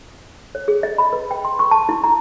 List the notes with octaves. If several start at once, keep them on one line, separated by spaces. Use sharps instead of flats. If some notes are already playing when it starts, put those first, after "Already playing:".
C#5
G#4
D#5
B5
B4
G5
C6
C#6
A5
E4
A#5